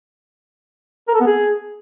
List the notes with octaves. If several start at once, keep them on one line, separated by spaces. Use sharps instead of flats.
A#4
A4
B3
G#4